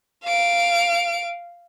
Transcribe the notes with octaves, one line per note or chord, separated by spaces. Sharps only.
F5 D7